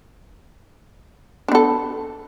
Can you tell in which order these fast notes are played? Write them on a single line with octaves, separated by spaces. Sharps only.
D4 B3 A4